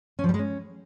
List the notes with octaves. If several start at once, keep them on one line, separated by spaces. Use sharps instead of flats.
C#4
F3
G3
G#3
C#4